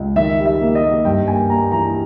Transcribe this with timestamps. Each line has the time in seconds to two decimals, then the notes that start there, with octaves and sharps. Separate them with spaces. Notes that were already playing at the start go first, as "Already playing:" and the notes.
Already playing: C#2
0.16 D#3 E5
0.38 G3
0.46 E5
0.61 A#3
0.75 D#5
0.83 A#3
1.05 G2 G5
1.28 A#3 G#5
1.49 A#3 A#5
1.72 E3 A#5